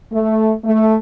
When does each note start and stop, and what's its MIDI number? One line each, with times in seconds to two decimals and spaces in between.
0.11 0.52 57
0.64 0.95 57